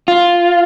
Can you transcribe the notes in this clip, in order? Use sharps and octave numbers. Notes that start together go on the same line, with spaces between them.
F4